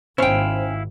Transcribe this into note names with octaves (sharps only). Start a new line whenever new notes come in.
G#1 C#4 E4 C5 F5 G5